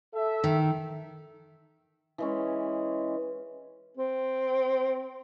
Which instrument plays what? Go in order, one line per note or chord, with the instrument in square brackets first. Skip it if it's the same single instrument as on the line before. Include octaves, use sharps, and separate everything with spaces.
[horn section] A4 E5
[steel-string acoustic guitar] D#3
[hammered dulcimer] E3 G#3 C#4
[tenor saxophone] C4